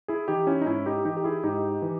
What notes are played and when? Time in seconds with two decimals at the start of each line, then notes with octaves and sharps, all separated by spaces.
0.08 E4 G#4
0.28 E3 D#4 G4
0.47 C#4 E4
0.61 D#4
0.66 G#2 C#4 E4
0.86 D#4 G4
1.05 E3 D#4 G4
1.17 G4
1.24 E4 G#4
1.43 G#2 D#4 G4
1.82 E3